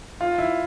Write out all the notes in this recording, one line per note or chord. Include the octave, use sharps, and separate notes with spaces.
F4
E4